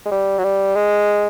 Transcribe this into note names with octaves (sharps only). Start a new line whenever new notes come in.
G#3
G3
F#3
G3
G#3